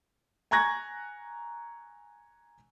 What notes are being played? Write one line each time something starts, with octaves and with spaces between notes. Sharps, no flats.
G#5 A#5 C#6 F#6 G#6 A#6